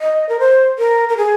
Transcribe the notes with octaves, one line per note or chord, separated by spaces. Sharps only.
D#5
A#4
C5
A#4
A#4
G#4